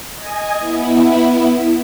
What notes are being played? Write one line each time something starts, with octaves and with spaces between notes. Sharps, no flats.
D#5 G#5
B3 E4